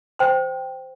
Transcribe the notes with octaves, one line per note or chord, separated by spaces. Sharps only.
C5 G5 C6